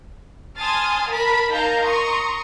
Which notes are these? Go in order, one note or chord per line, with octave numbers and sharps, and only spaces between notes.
G#5 A5 C6 D#6 F6 A6
A#4 A5 B5
D#4 A#4 F5 A5 A#5 G6
A#5 C6 C#6 D#6